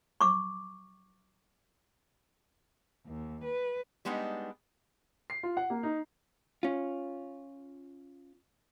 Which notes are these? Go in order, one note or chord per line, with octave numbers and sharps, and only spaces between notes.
C#6 D6
D#2
B4
G3 G#3 B3 D4 D#4
C7
F4
F#5
A#3
D#4
C#4 F4